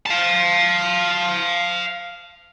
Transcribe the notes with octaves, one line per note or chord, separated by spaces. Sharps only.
F5 A5